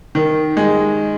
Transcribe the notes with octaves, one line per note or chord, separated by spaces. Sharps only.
D#3
G#3